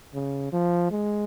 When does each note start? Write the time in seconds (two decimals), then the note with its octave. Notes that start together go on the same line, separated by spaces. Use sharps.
0.14 C#3
0.53 F3
0.91 G#3